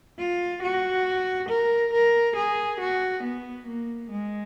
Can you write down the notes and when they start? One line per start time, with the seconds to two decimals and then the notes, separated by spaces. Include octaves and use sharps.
0.18 F4
0.62 F#4
1.49 A#4
1.93 A#4
2.36 G#4
2.80 F#4
3.23 B3
3.67 A#3
4.10 G#3